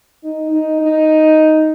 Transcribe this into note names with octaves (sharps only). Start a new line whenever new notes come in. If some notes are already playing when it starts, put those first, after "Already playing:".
D#4
D#4
D#4